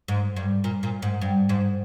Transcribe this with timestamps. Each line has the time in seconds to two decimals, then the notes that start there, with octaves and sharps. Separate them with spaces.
0.08 G#2
0.36 G2
0.64 A#2
0.83 A#2
1.02 G#2
1.21 G2
1.49 G#2